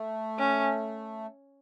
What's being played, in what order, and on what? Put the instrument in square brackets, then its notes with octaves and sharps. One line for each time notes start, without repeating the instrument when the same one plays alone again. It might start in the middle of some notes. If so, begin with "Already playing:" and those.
Already playing: [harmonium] A3
[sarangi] C#4